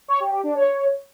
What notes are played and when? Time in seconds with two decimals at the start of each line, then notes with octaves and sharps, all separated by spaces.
0.08 C#5
0.20 G4
0.32 G4
0.43 D4
0.55 C#5